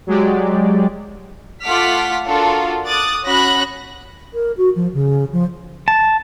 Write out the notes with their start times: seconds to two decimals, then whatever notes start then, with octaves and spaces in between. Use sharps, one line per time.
0.07 F#3 G#3 G4 D5
1.63 A3 F4 F#5 D6 F6 B6
2.26 D4 F4 F#4 A4 A#4
2.86 D6 D#6 F#6 A6
3.26 C#4 F#4 B5 F#6 A#6
4.34 A#4
4.57 F#4
4.76 F3
4.94 C#3
5.33 F3
5.88 A5